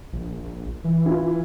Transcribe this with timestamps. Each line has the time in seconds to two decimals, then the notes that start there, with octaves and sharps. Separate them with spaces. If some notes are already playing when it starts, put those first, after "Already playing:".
0.13 A#1
0.84 E3
1.06 E4 F4